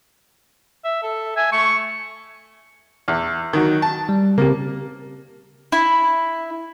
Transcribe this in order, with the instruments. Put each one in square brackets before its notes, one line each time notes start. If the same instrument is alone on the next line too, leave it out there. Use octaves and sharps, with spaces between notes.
[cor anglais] E5
A4
[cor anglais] E5 [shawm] G#5
[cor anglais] A3 [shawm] C#6
[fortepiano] E2
D#3 F#3
A5
[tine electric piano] G3
[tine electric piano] C#3 C4 G4 [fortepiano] A#3
[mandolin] E4